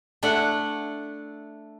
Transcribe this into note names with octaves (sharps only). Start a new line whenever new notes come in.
A3 D4 E4 D5 F#5